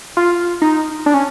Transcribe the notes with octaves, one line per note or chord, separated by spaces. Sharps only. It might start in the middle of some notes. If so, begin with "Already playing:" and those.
F4
D#4
D4
C#4